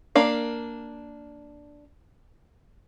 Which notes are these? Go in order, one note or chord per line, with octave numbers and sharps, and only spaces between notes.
A#3 D4 F5